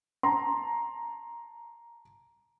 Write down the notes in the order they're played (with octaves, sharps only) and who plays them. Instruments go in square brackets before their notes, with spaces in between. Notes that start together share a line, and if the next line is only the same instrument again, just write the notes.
[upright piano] A5 A#5 C6